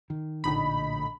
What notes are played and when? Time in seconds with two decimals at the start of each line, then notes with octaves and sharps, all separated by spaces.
0.10 D#3
0.44 A#1 A2 D3 D#4 B5